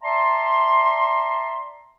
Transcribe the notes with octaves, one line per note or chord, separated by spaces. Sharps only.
D5 E5 A5 A#5 C6